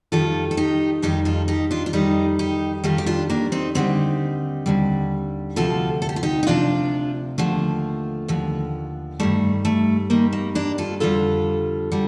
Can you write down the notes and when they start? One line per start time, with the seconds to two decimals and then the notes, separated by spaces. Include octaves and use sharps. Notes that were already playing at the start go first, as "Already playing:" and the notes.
0.12 F2 D#3 G3 F4 A4
0.51 A4
0.57 D#4 G4
1.02 F2 D#3 G3 D#4 G4
1.25 F4 A4
1.48 D#4 G4
1.71 D4 F4
1.86 F4
1.93 F2 D#3 G3 D#4 G4
2.39 D#4 G4
2.84 F2 D#3 G3 F4 A4
2.98 G4
3.06 D4 F4
3.30 A#3 D4
3.52 C4 D#4
3.75 D#2 D3 G3 C4 D#4
4.66 D#2 D3 G3
5.56 D2 C3 F3 F4 A4
6.02 A4
6.09 G4
6.16 F4
6.23 D#4 G4
6.43 D#4
6.47 D2 C3 F3 D4 F4
7.38 D#2 D3 F3 A3
8.28 D#2 D3 F3
9.20 G2 D#3 G3 A3
9.65 A3
10.10 G2 D#3 G3 A#3
10.33 A#3
10.55 A#3 D4
10.78 F4 A4
11.00 F2 D3 G3 F4 A4
11.92 D3 G3